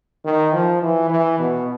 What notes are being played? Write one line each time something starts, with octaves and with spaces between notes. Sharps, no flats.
D#3
F3
E3
E3
B2